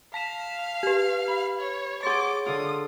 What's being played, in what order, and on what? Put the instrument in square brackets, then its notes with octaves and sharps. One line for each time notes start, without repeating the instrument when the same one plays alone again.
[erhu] F5 [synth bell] A5 B6 E7
[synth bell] G4 B4
[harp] B5
[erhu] C#5
[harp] G#4 C#5 [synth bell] F#5 C6 A6 [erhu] D6
[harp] D3 F4 [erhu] D#6